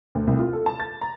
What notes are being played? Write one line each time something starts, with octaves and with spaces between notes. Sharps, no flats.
D2
C2
F4
A4
A5
A6
A#5